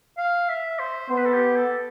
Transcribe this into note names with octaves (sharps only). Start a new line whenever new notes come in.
F5
E5
C5
B3 C5
B4
A4
G4
A4